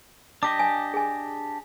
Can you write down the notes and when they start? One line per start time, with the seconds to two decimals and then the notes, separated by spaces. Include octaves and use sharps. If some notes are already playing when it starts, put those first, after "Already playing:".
0.43 D4 G4 D#5 D6
0.59 D5 G#5
0.94 G#4 G#5